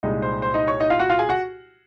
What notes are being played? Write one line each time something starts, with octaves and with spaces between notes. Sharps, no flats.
C2 A#2 G#3 D#4 D#5
C5
C5
D#4 D#5
C#5 C#6
D#4 D#5
F4 F5
F#4 F#5
F4 F5
G#4 G#5
F#4 F#5